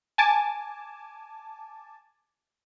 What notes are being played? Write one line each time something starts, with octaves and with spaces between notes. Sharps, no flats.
G#5 A5 D6